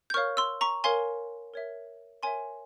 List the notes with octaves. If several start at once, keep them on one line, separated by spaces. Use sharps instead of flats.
G6
A#4 C#5 F5 C#6 F6
C6 E6
A#5 C#6
A#4 C#5 F5 G#5 C6
A#4 C#5 E5
A#4 C#5 E5 G#5 C6